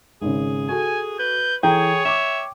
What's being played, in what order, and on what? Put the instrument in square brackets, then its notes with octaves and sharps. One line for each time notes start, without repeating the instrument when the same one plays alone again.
[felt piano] G#1 C#3 [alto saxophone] G#4
[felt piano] F#4 A4 [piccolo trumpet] G#5
[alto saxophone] B4 [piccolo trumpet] G6
[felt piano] E3 A4 A#5 [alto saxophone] G#4 [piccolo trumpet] C#5 [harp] G5
[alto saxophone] E5 [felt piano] C#6 D6